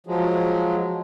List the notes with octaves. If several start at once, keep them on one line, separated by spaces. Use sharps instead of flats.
F3 F#3 G#3